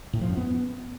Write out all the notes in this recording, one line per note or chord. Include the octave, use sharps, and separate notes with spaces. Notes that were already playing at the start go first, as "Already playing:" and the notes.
A2
F3
F#2
B3